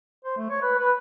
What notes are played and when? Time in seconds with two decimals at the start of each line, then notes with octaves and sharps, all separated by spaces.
0.25 C5
0.37 A3
0.50 C#5
0.62 B4
0.78 B4